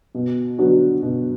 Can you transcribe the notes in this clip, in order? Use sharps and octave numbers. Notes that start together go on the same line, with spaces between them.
B2
F#3 B3 D4 F#4
B2